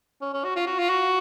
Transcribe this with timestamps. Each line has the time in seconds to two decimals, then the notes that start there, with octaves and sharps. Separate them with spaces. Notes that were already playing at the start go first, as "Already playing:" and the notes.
0.21 C#4
0.33 C#4
0.44 F#4
0.56 F4
0.66 F#4
0.79 F4
0.89 F#4